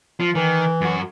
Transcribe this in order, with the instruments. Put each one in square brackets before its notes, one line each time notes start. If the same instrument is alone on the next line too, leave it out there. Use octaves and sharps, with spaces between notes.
[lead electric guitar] F3
[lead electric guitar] D#3 [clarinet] E3
[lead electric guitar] F#2 F#4